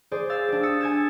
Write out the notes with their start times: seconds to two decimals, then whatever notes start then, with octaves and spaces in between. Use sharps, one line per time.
0.12 G#4 C5 D5
0.29 F5 E6 A6
0.48 D4 G4
0.63 D#6 E6 A6 C#7
0.80 G#5 G#6 A6 E7